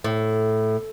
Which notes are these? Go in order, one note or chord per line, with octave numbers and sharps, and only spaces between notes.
A2